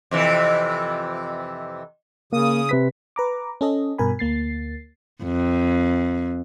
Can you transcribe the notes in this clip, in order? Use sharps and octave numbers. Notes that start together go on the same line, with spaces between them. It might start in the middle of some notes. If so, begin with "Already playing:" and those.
F2 C3 E3
C#3 A#3 D#6
C3 B4 B6
B4 A#5 D6
C#4 A4 D#5
G2 B2 A#4 G#5 B5
D2 A#3 A6 C7
F2